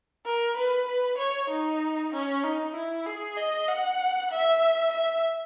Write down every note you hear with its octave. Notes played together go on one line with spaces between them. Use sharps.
A#4
B4
B4
C#5
D#4
C#4
D#4
E4
G#4
D#5
F#5
E5
E5